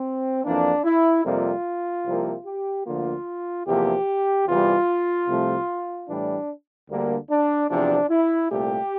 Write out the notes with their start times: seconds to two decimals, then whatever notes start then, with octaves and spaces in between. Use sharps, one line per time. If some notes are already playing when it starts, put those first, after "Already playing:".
Already playing: C4
0.44 F2 E3 A#3 D4
0.84 E4
1.24 F2 C3 G3 A#3 F4
2.06 C2 C3 F3 A#3
2.46 G4
2.86 D2 D3 F3 A#3 F4
3.67 E2 C3 F3 A#3 G4
4.47 E2 C3 E3 G3 F4
5.28 C2 C3 F3 A3
6.08 A2 E3 G3 D4
6.89 D2 D3 G3 A#3
7.29 D4
7.69 E2 C3 F3 D4
8.09 E4
8.50 C2 A#2 A3 G4